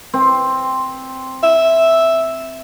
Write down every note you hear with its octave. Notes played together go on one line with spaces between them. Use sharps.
C4
E5